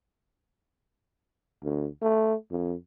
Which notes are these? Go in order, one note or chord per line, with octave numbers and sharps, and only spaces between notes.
D2
A3
F2